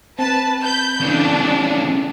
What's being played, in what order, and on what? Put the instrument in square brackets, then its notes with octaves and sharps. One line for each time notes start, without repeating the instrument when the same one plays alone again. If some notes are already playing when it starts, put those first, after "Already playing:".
[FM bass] C4 [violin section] B4 A5
[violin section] B5 G6
[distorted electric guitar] C#3 E3 [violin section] D4